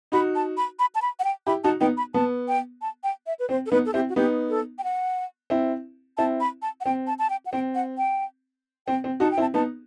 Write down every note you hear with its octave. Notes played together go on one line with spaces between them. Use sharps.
D#4 F#4 B5
A5
B5
B5
A5
B5
F#5
G5
E4 G4 B5
D#4 F#4 A5
B3 D#4 G5
B5
B3 A5
G5
A5
G5
E5
B4
C4 C5
A4
B3 D#4 B4
A4
C4 E4 G4
F#4
B3 D#4 G4
A4
G5
F#5
C4 E4
C4 E4 A5
B5
A5
F#5
C4 G5
A5
A5
G5
F#5
C4 G5
F#5
G5
C4 G5
C4
D#4 F#4 A5
G5
C4 E4
A5
B3 D#4 A5